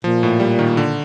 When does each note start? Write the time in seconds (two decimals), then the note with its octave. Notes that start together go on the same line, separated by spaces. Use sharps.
0.04 A#2 F3
0.23 A2
0.40 G3
0.59 D#3
0.77 D3